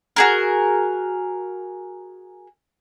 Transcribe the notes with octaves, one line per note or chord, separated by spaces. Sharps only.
F#4 G#4 A#4